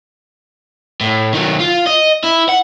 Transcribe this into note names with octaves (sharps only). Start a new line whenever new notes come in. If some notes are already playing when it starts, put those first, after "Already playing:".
A2
D#3 F#3
F4
D#5
E4
F#5